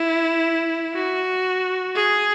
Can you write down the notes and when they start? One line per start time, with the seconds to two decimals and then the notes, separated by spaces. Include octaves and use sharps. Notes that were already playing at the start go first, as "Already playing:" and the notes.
Already playing: E4
0.95 F#4
1.95 G#4